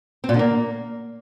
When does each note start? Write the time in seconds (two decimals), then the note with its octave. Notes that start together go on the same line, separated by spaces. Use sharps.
0.24 C4
0.29 A#2
0.34 D3
0.39 A#3